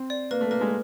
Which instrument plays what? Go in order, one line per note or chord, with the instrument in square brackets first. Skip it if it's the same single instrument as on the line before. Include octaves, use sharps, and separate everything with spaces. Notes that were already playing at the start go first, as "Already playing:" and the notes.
Already playing: [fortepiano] C4
[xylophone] D5
[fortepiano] A#3 [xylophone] B4
[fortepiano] A3
[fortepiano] A#3 [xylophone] B4
[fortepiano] G#3